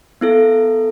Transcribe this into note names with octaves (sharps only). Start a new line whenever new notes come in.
B3 E4 A4